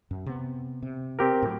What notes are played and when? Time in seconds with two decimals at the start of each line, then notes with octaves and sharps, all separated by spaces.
0.11 F#2
0.26 C3 B3
0.82 C3
1.19 C4 G4 A#4
1.42 A2 F#3